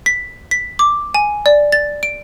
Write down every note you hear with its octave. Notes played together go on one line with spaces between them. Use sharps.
B6
B6
D6
G#5
D5
A6
D7